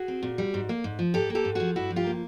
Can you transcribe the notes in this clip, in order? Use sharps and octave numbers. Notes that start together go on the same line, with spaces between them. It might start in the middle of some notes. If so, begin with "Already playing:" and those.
Already playing: F#4 G#4
C4
A#2
G3
G#2
A#3
G#2
F3
G#2 G4 A4
A#3
G4 A4
G#2
F3 F#4 G#4
G2 E4 F#4
F3
F4 G4
A#3